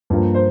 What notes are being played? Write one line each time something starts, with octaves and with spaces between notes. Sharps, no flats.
G2 F3 A#3
C5